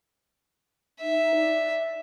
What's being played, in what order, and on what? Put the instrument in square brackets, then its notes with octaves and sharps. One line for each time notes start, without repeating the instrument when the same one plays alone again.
[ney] D#4 [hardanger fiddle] E5
[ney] D5